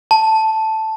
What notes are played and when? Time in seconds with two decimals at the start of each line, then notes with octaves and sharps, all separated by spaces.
0.11 A5